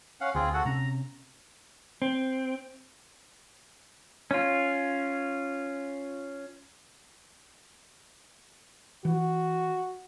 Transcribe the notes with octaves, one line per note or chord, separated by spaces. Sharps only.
C#4 F5 F#5
D2 C4 F4 G#4
F#4 A4 F#5
C3 C4 C#4 A#5
C4
C#4 F4
E3 F#4